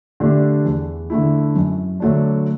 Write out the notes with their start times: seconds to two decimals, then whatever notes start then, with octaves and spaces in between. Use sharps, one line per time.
0.20 D3 A3 D4 G4
0.65 E2
1.10 D3 A3 E4
1.55 F#2
2.00 D3 F#3 A3 D4